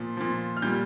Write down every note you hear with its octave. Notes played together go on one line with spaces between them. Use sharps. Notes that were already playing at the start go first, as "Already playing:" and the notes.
Already playing: A#2 F3
A#2 F3
F6
A#2 G3 G6